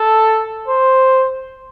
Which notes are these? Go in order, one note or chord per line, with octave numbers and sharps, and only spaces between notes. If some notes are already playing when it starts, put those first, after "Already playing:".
Already playing: A4
C5